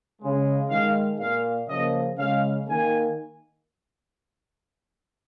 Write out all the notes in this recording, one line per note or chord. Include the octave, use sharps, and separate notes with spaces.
C#3 G#3
D#3 G#3 F5
A#2 A#3 F5
C#3 F3 A#3 D#5
C#3 G#3 F5
D#3 A#3 G#5